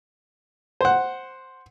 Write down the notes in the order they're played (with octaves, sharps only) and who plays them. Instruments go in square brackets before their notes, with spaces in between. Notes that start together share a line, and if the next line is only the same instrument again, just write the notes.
[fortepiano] C5 F#5